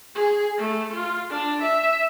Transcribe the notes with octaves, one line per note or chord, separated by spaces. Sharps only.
G#4
A3
F4
D4
E5